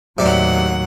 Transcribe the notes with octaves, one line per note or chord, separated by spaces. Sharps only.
D#2 A2 C3 F#3 D5 F#5